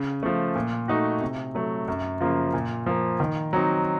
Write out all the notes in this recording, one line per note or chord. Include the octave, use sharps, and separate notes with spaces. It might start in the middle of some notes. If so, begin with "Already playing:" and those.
Already playing: C#3
F3 A3
A#2
A3 D#4 F#4
C3
F#3 A3
F#2
C#3 F3 A#3 F4
A#2
F3 A#3
D#3
F#3 C4 D#4